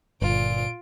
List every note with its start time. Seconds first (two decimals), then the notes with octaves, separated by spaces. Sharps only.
0.22 G1 A#2 F4 D7